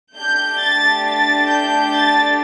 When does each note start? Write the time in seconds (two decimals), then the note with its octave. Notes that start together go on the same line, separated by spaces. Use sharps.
0.16 A3 D4 G4 G6
0.61 A6
1.06 A6
1.51 G6
1.96 A6